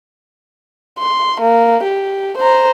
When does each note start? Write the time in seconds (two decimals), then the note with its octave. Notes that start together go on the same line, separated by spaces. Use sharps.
0.99 C6
1.41 A#3
1.83 G4
2.38 C5 A#5